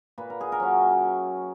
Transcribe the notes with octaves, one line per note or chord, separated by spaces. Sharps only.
A#2 B4
A#4
G#4
A#4
F#3 C#4 E4